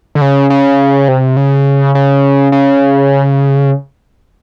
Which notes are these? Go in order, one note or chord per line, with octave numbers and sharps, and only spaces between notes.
D3
C#3
C#3
C3
C#3
C#3
C#3